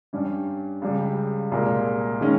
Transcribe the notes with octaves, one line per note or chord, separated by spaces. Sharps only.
G2 G3 C#4
C#2 C#3 G3
C2 A#2 G#3
D#3 G#3 C#4